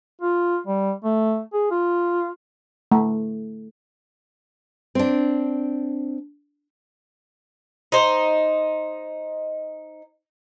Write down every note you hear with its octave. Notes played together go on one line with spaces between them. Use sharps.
F4
G3
A3
G#4
F4
A3
C4 D4
D#4 C5